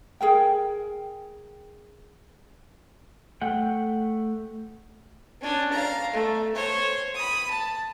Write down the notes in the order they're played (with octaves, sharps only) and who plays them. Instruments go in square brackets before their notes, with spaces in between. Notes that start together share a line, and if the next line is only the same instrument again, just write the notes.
[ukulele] G#4 A#4 G5
[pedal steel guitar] A3 F#5 G5
[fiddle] C#4 D4
F5 A#5
A3
C5 C#5
B5 D#6
A5